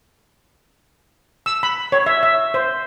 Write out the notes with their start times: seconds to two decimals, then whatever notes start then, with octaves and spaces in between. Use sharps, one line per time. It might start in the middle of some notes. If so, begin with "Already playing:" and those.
1.46 E6
1.63 B5
1.92 C#5
2.06 E5
2.23 E5
2.54 C5